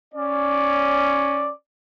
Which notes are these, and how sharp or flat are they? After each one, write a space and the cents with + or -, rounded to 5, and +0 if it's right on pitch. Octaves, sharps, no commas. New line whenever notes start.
C#4 +0 D5 +0